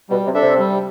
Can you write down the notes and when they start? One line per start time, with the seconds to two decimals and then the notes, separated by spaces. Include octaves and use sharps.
0.10 B2 G3
0.26 C3
0.34 D4 A4 E5
0.42 C3
0.59 G3